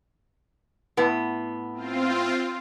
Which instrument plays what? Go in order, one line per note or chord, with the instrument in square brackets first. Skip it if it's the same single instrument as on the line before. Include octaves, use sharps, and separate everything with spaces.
[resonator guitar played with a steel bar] A2 B3
[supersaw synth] C4 F4